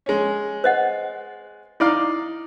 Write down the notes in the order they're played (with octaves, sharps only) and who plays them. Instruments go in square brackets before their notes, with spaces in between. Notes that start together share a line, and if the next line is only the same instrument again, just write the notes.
[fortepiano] G#3 C#4
[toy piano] C5 D#5 F#5
[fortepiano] D#4 D5 F5 [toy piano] E4